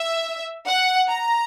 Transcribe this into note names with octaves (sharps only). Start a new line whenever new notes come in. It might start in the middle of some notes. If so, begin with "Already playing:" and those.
Already playing: E5
F#5
A#5